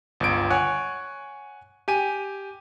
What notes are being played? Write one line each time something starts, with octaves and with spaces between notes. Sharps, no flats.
G1 C#2 D7
C#5 F#5 G#5 F#6
G4 G#5 D#7